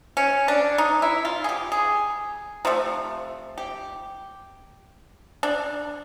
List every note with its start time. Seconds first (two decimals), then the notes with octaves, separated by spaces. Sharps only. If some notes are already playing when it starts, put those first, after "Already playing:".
0.17 C#4
0.48 D4
0.78 D#4
1.02 E4
1.25 F4
1.44 G#4
1.49 G4
1.72 G#4
2.65 C3 F3 A3
3.58 G4
5.43 D4